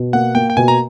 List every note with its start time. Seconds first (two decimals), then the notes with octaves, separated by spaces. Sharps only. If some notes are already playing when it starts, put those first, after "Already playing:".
Already playing: B2
0.13 A#3 F#5
0.35 A#3 G5
0.50 G5
0.57 B2 G#5
0.68 A#5